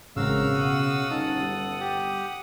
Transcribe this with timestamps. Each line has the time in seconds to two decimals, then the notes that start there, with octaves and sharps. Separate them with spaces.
0.17 A1 C#3 G#3 C4 F#4 A#4 F5 E6
0.55 B2 F#5 D#6
1.11 G1 C#4 D#4 A4
1.39 G3
1.81 G4